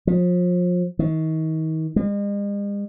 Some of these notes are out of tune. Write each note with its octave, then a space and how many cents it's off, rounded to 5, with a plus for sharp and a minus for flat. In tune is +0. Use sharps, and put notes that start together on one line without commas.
F3 +35
D#3 +35
G#3 -45